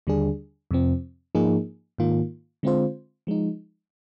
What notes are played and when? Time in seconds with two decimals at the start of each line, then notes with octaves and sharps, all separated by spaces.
0.07 D#2 D3 G3 D4 G#4
0.71 F2 C3 F3 C4
1.35 G#2 F3 A#3 D#4 G#4
1.98 G#2 D#3 A#3 F4
2.63 D3 G#3 C4 F4 C5
3.27 F3 G#3 D#4